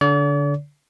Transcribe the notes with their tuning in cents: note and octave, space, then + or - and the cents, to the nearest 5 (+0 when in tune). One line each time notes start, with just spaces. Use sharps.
D3 -20 D5 -45